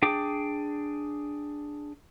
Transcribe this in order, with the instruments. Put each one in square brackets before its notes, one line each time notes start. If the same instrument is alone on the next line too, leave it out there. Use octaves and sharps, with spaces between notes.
[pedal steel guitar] D4 G#4 G5 D6